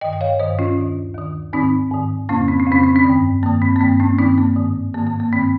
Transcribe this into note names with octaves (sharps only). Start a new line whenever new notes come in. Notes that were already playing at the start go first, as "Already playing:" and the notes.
G2 D#3 D#5 G5
G5
C#5 F5
G2 D#3 C5 D#5
C#4 F4
D#2 D#3
D#2 D#3
G#2 D#3 C4 D#4
G#2 D#3
F2 C#3 A#3 C#4
C4
C#4
F2 C#3 C4
C#4
C4
G2 D#3
G2 D#3 A#3
C4
A#3
G2 D#3 C4
A#3 C#4
G2 D#3 C4 D#4
A#3
G#2 D#3
G#2 D#3 A#3
A#3
A#3
G2 D#3 C4